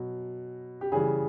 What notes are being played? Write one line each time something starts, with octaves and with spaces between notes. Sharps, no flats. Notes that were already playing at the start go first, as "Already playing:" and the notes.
Already playing: B2 F#3
G4
C#3 E3 G3 G#4